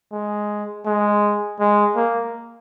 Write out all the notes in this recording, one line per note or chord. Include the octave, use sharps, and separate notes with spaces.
G#3
G#3
G#3
A#3